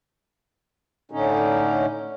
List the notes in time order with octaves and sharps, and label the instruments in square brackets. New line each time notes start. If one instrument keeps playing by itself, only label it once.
[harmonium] A2 D3 C#4 D#4